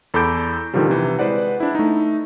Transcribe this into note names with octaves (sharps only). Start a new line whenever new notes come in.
E2 A4 B5 D6 G6 D7
A#2 D3 D#3 F3 G3
C3 E3
G#3 B4 C5 D5 F#5
D4 E4
A3 D#4